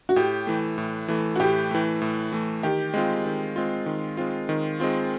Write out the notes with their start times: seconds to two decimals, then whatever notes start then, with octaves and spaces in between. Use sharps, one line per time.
0.09 F#4
0.16 A2 G4
0.47 E3 A3
0.78 A2
1.08 E3 A3
1.36 F#4
1.40 A2 G4
1.71 E3 A3
2.02 A2
2.32 E3 A3
2.63 D#3 G4
2.94 G#3 C4 F4
3.26 D#3
3.56 G#3 C4 F4
3.86 D#3
4.17 G#3 C4 F4
4.49 D#3
4.80 G#3 C4 F4